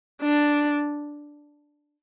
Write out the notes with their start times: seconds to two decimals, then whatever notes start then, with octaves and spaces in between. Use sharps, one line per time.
0.22 D4